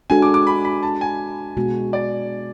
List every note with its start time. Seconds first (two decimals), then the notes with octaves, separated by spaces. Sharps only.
0.10 G#3 D4 F#4 A4 G#5
0.22 D6
0.34 D6
0.47 B5
0.65 B5
0.83 A5
1.01 G#5
1.57 B2 G#3 B3 F#4
1.93 D5